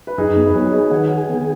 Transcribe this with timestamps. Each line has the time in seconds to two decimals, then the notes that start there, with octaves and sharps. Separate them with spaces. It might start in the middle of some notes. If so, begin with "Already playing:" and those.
0.07 B4
0.18 F#2 D#4 G#4
0.37 B3
0.46 B4
0.54 F#3 G#4 C#5
0.73 G#4 B4 D#5
0.91 D#3 C#5 F#5
1.10 G#4
1.29 B3